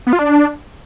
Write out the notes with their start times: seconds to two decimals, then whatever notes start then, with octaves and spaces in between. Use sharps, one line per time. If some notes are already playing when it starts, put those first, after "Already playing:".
0.07 B3
0.13 F4
0.19 D4